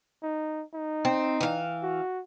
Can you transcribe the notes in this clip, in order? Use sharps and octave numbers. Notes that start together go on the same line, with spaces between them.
D#4
D#4
C4
E3 F5
F#4